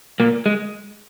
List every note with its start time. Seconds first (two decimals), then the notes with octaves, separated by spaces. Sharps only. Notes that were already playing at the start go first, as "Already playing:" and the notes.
0.20 A#2 A#3
0.46 G#3